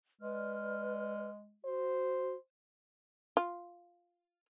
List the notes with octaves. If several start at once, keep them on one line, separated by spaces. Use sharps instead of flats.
G#3 B4 D5 F6
F#4 C5
F4